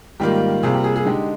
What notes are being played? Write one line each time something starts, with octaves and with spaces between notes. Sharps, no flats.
G#2 D#3 G3 A#3 F4 G4
C3 G3 A#3 F4 G#4
G4
G#4
G#4
D3 G#3 D#4 G4